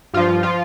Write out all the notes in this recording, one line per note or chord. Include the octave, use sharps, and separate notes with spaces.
G2 F3 F4
F3 F4